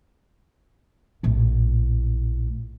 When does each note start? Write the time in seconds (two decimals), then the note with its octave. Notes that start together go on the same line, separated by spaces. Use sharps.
1.23 A#1 A2